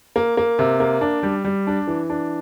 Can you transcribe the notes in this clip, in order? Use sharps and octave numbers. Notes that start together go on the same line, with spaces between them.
A#3
A#3
C3
A#3
D4
G3
G3
D4
E3
D4